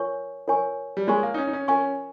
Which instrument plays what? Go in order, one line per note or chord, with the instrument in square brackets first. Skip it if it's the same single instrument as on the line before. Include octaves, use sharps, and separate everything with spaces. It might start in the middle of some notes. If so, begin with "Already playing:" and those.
Already playing: [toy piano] F4 A#4 C#5 G#5 C#6
F4 A#4 C#5 G#5 C#6
[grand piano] G3
[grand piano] G#3 [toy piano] F4 A#4 C#5 G#5 C#6
[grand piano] A#3
D#4
C#4
D#4
C#4
[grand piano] C#4 [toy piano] F4 A#4 C#5 G#5 C#6